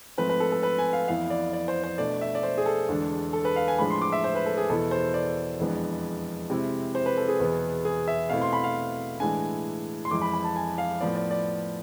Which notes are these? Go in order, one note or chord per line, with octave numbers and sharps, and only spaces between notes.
G#2 F3 A3 C4 B4
B4
A4
A4
B4
G#5
F5
F2 E3 B3 E4 F5
D5
D5
C5
C5
B2 A3 D4 D5
E5
D5
C5
G#4
A4
E2 D3 G#3 D4
A4
B4
F5
G#5
A2 F3 G#3 D4 B5
C6
D6
E5
C5
B4
A4
G#4
E2 B2 B3 E4 A4
C5
D5
F2 E3 G#3 B3 D4
C3 G#3 C4 E4
C5
B4
A4
G#4
E2 B2 B3
G#4
E5
B2 A3 C4 E4 F5
C6
B5
F5
A2 E3 G#3 D4 G#5
C6
F2 E3 G#3 D6
B5
B5
A5
G#5
F5
A2 F3 B3 D5
D5
D5